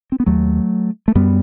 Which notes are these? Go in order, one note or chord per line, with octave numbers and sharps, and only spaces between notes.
C4
B3
D#2 F#3 A3
A3
F#2 G3 B3